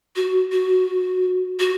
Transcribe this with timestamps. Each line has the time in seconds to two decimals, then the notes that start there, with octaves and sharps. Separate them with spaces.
0.16 F#4
0.52 F#4
1.60 F#4